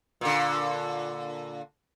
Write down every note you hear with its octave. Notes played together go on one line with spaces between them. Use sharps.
A#2 D3